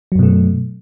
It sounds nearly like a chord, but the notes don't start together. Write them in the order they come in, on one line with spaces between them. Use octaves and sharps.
F#3 F#2 B2 A3